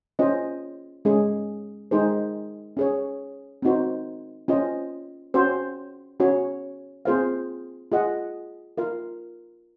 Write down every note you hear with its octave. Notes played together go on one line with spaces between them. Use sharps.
C#4 F4 C5 D#5
G#3 C#4 G#4
G#3 D#4 G#4 C5
C#4 G#4 C#5
C4 D#4 F#4 C5
C#4 F4 C5 D#5
C#4 F#4 C5
C#4 F#4 C#5
C4 F4 G#4 C5 F5
F4 G#4 D#5 F#5
F4 A#4 F5